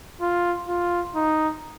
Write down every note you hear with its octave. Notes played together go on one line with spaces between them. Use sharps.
F4
F4
D#4